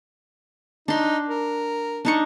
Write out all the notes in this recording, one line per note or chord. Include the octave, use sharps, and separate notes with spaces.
D4 D#4 C6
A#4
D4 D#4 C#6